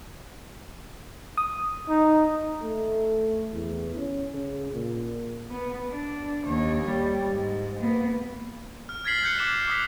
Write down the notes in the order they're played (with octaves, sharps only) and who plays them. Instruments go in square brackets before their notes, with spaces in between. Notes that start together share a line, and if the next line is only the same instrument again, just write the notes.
[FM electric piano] D#6
[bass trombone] D#4
A3
E2
C#4
C#3
A#2
[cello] B3
D4
D#2 C#5
G3
G#2
A#3 B3
[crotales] F6
F6 G#6 A6 B6 C7 F#7
F#6 G6 C#7 G7
D6 F#6 C#7 E7
D6 D#6 B6